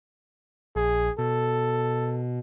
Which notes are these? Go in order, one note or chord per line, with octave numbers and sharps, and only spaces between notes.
A#1 G#4
B2 A4